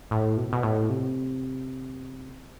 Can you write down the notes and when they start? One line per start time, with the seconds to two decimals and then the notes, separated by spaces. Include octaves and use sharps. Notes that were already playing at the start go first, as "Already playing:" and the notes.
0.11 A2
0.37 B2
0.53 B2
0.63 A2
0.89 C3